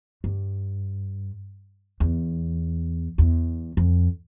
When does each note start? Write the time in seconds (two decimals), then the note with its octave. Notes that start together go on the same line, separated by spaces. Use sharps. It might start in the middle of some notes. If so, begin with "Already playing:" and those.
0.24 G2
2.00 E2
3.18 E2
3.77 F2